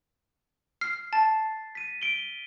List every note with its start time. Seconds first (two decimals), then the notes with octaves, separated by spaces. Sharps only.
0.81 F6 C7
1.13 A5 A6
1.75 B6 D#7
2.02 B6 D7 G7